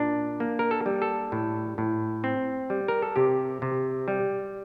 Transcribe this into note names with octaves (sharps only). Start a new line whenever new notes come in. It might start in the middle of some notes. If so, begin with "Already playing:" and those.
Already playing: A#2 D4
A#3
A#4
A4
G3
A4
A2
A2
C4
G3
A#4
A4
C3 G4
C3
G3